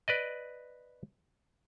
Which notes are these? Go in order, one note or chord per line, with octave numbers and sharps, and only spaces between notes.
B4 D5 D#5